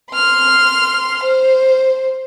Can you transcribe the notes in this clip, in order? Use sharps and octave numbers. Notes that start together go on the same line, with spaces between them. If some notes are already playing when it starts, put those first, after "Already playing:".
C6 F6
C5